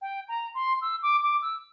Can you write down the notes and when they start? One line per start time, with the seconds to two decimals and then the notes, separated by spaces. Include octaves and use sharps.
0.01 G5
0.28 A#5
0.54 C6
0.81 E6
1.02 D6
1.22 D6
1.42 E6